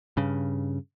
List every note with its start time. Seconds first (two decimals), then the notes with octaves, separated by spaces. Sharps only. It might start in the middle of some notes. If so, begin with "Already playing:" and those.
0.17 G2 C#3